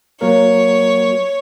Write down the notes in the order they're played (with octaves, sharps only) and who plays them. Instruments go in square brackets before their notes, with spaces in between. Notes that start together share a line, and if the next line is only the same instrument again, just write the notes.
[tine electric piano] F#3 A#3 A#4 [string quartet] C#5